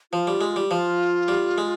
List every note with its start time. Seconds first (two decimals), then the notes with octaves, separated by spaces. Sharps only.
0.12 F3 F4
0.27 G3
0.41 G#3
0.56 G3
0.70 F3 F4
1.28 G3
1.58 G#3